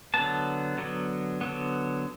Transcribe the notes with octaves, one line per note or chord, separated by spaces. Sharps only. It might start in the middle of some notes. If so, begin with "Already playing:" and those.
D3 F#3 B3 A5
D3 F#3 B3
D3 F#3 B3